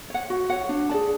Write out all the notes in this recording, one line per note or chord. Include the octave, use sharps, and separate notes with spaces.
C#5 F#5
F#4
C#5 F#5
D4
G#4 D5 A5